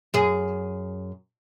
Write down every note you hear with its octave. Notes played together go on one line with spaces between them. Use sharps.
F#2 G#4